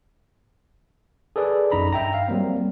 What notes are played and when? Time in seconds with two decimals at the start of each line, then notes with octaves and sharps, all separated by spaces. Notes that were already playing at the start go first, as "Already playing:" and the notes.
1.36 G#4 A4 B4 D5
1.71 A#1 F#2 D#4 A#5 B5
1.93 G2 E5 G5 A#5
2.14 F5
2.28 F#3 G3 A#3 C4